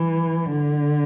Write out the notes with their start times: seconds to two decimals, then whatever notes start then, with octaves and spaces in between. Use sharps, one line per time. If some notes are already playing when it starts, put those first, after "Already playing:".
Already playing: E3
0.50 D3